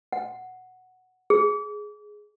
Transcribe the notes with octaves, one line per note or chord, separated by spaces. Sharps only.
F#5
G#4